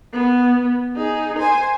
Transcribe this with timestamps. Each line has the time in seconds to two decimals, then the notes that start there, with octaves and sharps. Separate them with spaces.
0.13 B3
0.96 D#4 G#4
1.39 C5 G#5